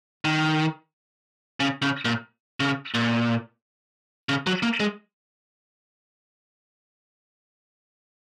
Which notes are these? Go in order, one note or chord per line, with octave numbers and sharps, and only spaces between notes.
D#3
C#3
C#3
A#2
C#3
A#2
C#3
F#3
A#3
G#3